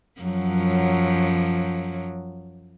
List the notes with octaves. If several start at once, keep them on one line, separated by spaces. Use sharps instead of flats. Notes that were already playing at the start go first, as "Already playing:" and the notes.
F#2 F3 F#3